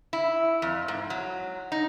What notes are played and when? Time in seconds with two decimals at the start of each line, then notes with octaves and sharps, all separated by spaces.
0.13 E4
0.62 F2
0.88 G#2
1.10 F#3
1.72 D#4